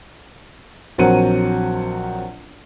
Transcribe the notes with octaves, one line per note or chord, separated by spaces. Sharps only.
A#1 F#3 C4 A#4 F#5 D#7